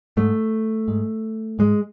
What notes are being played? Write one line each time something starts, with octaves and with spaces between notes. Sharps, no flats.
G#2 A3
G#2
G#2 G#3